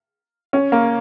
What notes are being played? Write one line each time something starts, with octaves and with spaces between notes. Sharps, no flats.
C#4
A#3